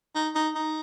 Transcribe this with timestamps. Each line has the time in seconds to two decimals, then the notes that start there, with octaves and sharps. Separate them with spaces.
0.15 D#4
0.35 D#4
0.55 D#4